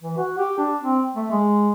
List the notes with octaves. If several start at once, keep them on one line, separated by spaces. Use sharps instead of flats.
E3
F#4
G4
D4
C4
A3
G#3